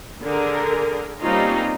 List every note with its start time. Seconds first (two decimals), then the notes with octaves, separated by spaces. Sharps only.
0.23 D3 G#4 A#4
1.22 G3 A#3 C4 C#4 D#4 F4